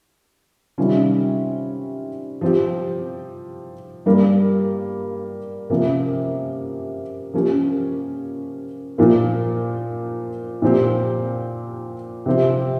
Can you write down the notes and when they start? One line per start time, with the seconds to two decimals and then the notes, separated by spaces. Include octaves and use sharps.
0.78 C3 D#3 G3 C#4 F4
2.41 F3 C4 G4
4.06 G2 G3 A#3
5.70 C3 F3 A#3 C#4
7.34 F3 A#3 C#4 G4
8.98 A#2 F3 A#3 F4
10.62 A#2 F3 C4 G4
12.26 C3 F3 C4 G4